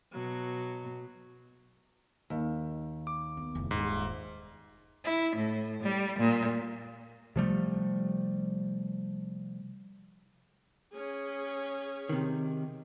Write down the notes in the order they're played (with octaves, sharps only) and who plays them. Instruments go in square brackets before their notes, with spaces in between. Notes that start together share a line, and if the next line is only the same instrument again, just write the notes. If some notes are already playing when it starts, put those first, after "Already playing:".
[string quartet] B2 F#3
[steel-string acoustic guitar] D#2
[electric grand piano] D6
[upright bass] B3
F1 E4
[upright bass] D#1 [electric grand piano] G#2
[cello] E4
A2
G3
A#2
[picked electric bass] C3 F3 G3 A3
[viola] C#4 G#4
[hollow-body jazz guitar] C3 D#3